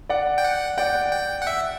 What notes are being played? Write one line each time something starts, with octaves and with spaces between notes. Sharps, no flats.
D5 F#5
G5
F#5
D5 F#5 G5
G5
F#5
E5